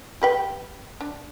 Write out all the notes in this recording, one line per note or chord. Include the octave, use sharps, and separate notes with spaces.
G4 B4 G5
D4